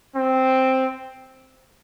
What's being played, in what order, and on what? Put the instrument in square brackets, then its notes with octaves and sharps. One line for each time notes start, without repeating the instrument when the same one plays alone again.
[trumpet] C4